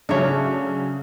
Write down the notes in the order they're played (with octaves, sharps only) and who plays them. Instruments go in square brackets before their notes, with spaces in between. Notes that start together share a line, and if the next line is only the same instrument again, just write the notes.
[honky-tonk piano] C#3 F#3 A3 [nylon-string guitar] C#4 E5 [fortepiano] D4 C#5